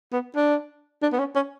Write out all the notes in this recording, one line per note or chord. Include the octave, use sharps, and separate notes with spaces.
B3
D4
D4
B3
C#4
C#4